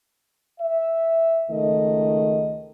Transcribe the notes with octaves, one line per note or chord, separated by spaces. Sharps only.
E5
C#2 D#3 A3 D#5